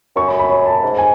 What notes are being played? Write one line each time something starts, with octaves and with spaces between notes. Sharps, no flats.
F#2 C#6
B5
B5
C#5
A5
G#2
G#5